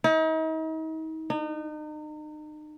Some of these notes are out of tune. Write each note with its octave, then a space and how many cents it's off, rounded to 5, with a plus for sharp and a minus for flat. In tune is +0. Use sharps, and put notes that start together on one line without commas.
D#4 +40
D#4 -35